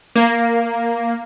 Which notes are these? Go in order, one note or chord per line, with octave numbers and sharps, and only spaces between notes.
A#3